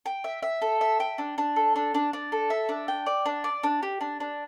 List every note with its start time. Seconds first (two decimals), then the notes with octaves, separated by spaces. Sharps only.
0.06 G5
0.24 E5
0.43 E5
0.62 A4
0.81 E5
1.00 G5
1.18 D4
1.38 D4
1.56 A4
1.76 D4
1.94 D4
2.13 D4
2.32 A4
2.50 E5
2.69 D4
2.88 G5
3.06 D5
3.26 D4
3.44 D5
3.64 D4
3.83 G4
4.01 D4
4.20 D4